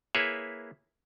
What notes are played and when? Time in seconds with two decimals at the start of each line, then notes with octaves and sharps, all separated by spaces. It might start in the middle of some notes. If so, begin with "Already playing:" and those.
0.15 A#3 E4 G#4 B4 C#5 E5